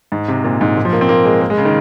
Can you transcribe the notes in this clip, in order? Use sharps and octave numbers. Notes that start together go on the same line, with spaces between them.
G#2
C3
A#2
G#2
A#2
F3
A#3
C4
A#3
G#3
A#3
G#3
C#3
D#3